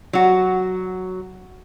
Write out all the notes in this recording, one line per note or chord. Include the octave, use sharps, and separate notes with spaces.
F#3 F#4